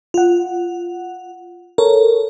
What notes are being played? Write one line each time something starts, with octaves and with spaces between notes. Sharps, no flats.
F4 F#5
A4 A#4 C#5